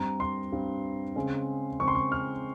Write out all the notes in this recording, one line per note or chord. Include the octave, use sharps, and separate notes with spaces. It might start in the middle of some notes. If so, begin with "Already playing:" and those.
Already playing: G2 G3 C4 A#5
C6
G2 G3 C4
C#3 G#3 C4
C#3 G#3 C4 C#6
C6
C#6
F6